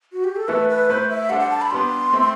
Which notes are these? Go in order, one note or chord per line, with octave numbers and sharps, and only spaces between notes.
F#4
G4
A4
E3 A3 E4 A4 B4
B4
A3 E4 B4 C5
E5
G3 D4 A4 C5 F#5
F#5
A5
B5
G3 B3 D4 G4 C6
A3 C4 E4